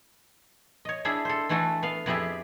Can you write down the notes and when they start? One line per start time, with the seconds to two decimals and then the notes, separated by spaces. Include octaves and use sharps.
0.85 C#5 D#5
1.05 D4 E4 G#4 E5
1.25 A4 C5
1.49 E3 A3 E4 F#4 A4
1.83 B3 F5
2.06 F2 B3 E4 G4 G#4 E5